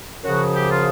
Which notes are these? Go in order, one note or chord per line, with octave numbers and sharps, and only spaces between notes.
F#2 C#3 F3 F#4
G4
F4